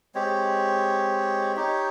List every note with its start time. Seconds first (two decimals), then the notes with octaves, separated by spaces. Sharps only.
0.15 G#3 C4 G4 C#5
1.56 D#4 G4 C#5